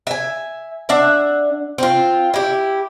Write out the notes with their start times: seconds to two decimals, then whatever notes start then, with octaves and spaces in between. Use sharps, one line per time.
0.07 E5 G#5
0.89 D4 E5 F#5
1.78 C4 F4
2.34 E4 G4